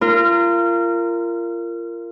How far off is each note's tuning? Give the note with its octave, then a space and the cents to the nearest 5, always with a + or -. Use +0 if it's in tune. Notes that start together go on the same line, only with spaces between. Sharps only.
F4 -30 A#4 -15